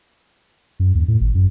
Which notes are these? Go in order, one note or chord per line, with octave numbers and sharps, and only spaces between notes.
F#2
D#2
A2
G#1
F#2